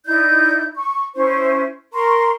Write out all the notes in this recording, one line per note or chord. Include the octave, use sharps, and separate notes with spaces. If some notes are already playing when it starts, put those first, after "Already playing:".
D#4 E4 D5 G6
C#6
C#4 E4 C5 C#6
A#4 A#5 C6 C#6